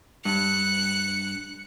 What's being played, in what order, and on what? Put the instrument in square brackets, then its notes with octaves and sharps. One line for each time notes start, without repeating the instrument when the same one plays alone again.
[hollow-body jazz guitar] G2 [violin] F#6 C#7